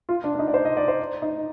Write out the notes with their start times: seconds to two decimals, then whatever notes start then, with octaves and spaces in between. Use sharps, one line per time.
0.09 F4
0.24 D4
0.34 D4
0.39 D#4
0.48 D5
0.54 C5
0.65 D#5
0.77 D5
0.88 C5
1.22 D#4